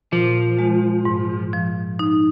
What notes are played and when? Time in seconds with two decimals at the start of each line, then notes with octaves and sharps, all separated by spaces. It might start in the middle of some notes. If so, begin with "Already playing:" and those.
0.12 A#2 F3
0.59 G#3
1.05 G#2
1.53 F3
1.99 D#4